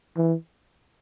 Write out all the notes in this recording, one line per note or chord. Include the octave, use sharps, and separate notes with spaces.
E3